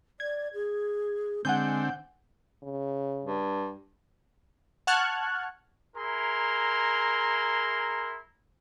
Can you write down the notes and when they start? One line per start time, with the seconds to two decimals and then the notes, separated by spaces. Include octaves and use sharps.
0.20 D5 G#6
0.53 G#4
1.45 D3 G#3 C4 F#5 G#5 G6
2.63 C#3
3.25 G2
4.87 F#5 A5 C#6 F6 F#6 G#6
5.96 E4 G#4 A#4 A#5 C6